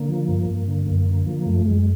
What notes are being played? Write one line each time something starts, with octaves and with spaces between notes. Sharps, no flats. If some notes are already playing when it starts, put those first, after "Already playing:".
Already playing: D3 A#3
F3
G2
G2
D3
F#2 A#3
D3
F3
F#2 A3
F#2 G#3